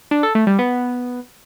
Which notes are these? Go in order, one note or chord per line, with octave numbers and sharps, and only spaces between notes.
D4
A4
A3
G3
B3